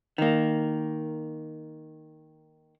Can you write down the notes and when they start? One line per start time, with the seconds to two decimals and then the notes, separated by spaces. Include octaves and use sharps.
0.18 D#3 A#3